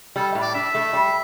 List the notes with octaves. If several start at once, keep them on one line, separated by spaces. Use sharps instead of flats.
G3 A4
A2
D5
D4 E5
A3
G3